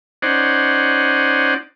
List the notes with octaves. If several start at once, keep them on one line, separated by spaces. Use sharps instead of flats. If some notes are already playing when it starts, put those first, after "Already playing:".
C#4 D#4 C5 D5 F#5